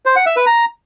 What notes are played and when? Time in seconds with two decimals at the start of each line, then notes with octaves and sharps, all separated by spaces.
0.06 C5
0.16 F#5
0.26 E5
0.36 B4
0.46 A#5